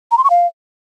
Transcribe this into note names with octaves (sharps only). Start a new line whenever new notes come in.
A#5
C6
C#6
F5